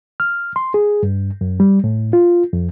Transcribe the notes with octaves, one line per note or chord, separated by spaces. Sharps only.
F6
C6
G#4
G2
F#2
G3
A2
F4
F2